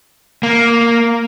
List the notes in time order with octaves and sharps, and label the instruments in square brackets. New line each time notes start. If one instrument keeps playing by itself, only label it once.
[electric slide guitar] A#3